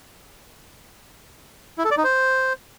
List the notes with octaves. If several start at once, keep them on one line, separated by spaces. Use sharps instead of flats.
E4
A4
D5
D#4
C5